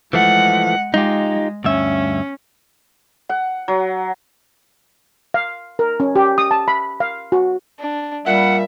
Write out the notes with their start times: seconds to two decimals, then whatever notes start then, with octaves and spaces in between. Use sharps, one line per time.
0.13 E3 F3 G#3 A3 F#5
0.94 G#3 D#4 F4 G4
1.65 D2 G2 C#4 E5
3.29 F#5
3.68 F#3
5.34 F5
5.79 A#4
6.00 C#4
6.16 G4
6.38 D#6
6.51 A5
6.68 B5
7.00 F5
7.32 F#4
7.80 D4
8.26 A#2 G3 E5 F#5